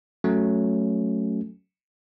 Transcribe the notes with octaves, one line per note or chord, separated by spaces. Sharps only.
F#3 A3 C#4